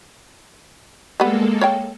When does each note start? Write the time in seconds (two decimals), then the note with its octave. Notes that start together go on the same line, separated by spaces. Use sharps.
1.20 G3 G#3 A#3 B3 A4
1.61 C#5 F5 G5